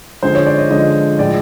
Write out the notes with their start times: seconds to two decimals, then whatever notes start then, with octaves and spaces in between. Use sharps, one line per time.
0.23 D3 F3 G#3 C5
0.35 C#5
0.47 D5
0.58 D#5
0.70 D3 F3 G#3 D#5
1.19 A2 F3 G#3 D5